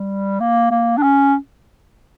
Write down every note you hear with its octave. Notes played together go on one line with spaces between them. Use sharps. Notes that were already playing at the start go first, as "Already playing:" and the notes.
Already playing: G3
A#3
A#3
D4
C#4